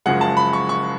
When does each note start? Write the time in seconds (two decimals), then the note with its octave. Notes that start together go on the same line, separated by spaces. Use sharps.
0.06 F#1 F#2 F3 G#3 F#5
0.21 A5
0.37 B5
0.53 C#6
0.69 C#6